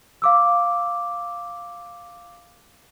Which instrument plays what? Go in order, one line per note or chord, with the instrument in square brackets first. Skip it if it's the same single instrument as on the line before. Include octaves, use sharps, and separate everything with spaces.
[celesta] F5 D6 E6